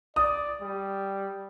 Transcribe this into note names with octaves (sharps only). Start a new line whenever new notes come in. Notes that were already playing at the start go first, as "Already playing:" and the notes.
D5 D#6
G3